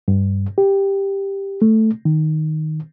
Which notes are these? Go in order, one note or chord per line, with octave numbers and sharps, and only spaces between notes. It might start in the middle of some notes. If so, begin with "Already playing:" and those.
G2
G4
A3
D#3